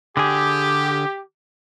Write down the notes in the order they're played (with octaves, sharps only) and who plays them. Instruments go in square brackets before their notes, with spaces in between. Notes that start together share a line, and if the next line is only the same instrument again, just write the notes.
[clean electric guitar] D3 G#4 [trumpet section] G4